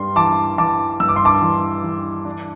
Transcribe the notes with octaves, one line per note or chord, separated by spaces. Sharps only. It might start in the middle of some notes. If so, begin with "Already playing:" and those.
Already playing: G2 G3 C6
E3 A5 D6
E3 A5 D6
G2 E6
D6
C6
A5 D6
E3
E3
D4